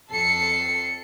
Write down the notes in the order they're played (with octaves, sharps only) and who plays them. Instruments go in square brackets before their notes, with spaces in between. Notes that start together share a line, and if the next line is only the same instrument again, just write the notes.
[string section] F2 A4 C7 C#7